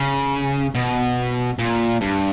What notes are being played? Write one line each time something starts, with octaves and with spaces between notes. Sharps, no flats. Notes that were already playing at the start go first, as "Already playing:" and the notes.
Already playing: C#3
B2
A#2
G2